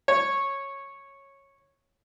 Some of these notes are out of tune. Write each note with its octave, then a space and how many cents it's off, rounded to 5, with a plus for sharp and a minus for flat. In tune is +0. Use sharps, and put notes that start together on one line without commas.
C#5 -10